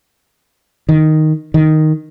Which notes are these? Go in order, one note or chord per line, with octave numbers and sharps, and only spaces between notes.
D#3
D#3